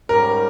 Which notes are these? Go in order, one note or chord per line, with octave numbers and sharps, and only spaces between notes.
G#2 G3 C#4 G4 A#4